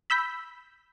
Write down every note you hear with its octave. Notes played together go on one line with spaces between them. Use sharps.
B5 E6 G6 B6